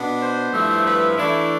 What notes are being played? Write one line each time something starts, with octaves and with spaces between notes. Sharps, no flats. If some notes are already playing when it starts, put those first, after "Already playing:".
Already playing: B2 B3 D4
C5
G2 F3 A3 E4
B4
E3 A3 D4 E4